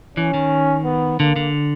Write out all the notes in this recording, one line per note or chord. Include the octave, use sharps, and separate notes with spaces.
E3 C#4
D#3
B3
D3 A#3
D3